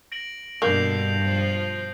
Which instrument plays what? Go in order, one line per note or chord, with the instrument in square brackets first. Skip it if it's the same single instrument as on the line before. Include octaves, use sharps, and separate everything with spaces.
[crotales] A#6 D7 F#7
[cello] G2 [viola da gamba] B2 D3 [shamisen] A#3 [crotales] G6 C7 F7
[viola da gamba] B2 F3 F4